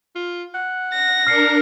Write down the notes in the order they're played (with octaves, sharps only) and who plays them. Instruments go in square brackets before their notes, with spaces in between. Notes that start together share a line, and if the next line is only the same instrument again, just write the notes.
[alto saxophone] F4
F#5
[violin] A#6
[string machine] D4 A#4 [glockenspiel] F6 C7 C#7